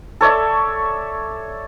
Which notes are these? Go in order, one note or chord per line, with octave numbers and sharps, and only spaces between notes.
A4 C#5 D5 E5